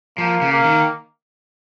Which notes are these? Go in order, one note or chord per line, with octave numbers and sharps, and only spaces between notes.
F3 A#3
C#3
A#3
D#3